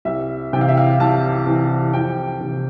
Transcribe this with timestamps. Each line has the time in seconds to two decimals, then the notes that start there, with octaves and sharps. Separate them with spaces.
0.05 C2 E5
0.53 C3 G5
0.57 E3 F5
0.69 E5
0.77 F5
1.00 C2 A5
1.46 C3 E3
1.93 F2 G5
2.40 C3 E3